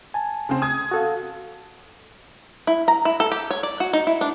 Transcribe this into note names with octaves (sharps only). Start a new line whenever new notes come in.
G#5 A5
C#3 C4
D#6 G#6
F#4 A4 F5
E4
A#5
E4
A4
G4
C#5
D5
F#4
D#4
E4
D4